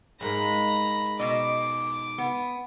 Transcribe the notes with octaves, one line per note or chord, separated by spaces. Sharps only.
G#2 G#3 A#3 A#5 B5
B2 D#5 D6
B3